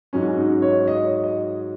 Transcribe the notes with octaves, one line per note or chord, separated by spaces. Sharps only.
G#2 F#3 C#4
C#4
D#4
C#5
D#5
C#5
D#5